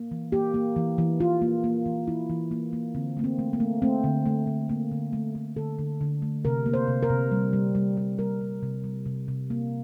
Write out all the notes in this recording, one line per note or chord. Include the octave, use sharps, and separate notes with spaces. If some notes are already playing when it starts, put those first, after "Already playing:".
Already playing: A#3
E3
A#3 G4
A#3
E3
E3
E3 F4
A#3
A#3
E3
E3 E4
E3
A#3
A#3
D3 C4
A3 A#3
C4
A3
A#3
A3
A3 C4
D3
A3
D3
A3 A#3
D3
A3
A3
D3 A4
D3
D3
A3
C3 A#4
A#3
C5
C3
A#4
C3
G3
G3
G3
G3
G3 A#4
G3
C3
G3
C3
C3
A#3